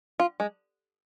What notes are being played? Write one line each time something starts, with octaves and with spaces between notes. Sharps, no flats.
F4
G#3